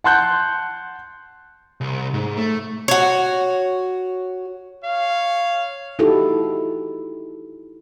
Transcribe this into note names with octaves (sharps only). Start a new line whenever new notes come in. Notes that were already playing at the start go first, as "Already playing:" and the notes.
F#5 A5 C6 F#6 G6
C2
G#2
A3
F#4 C#5
C#5 F5
D#4 E4 F#4 G4 A4